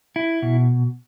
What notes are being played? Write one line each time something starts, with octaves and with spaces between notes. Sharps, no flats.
E4
B2